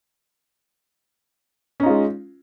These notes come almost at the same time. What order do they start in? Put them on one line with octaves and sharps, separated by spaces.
C#4 D#4 F4 G#3